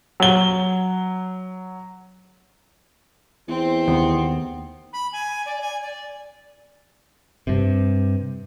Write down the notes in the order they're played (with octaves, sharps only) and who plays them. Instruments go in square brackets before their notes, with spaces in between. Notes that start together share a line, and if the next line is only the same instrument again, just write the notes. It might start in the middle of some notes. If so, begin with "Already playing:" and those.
[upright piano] F#3 G7
[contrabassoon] E2 [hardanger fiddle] C4
[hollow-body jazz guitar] D#2 [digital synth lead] B3
[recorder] B5
G#5
D5
G#5
D5
[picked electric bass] G2 C3